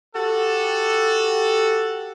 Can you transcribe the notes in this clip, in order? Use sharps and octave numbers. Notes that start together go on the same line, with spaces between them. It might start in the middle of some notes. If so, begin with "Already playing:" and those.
F#4 G4 A4